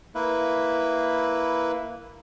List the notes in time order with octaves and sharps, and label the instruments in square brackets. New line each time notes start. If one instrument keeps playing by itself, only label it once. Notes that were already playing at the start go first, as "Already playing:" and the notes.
[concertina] A#3 E4 B4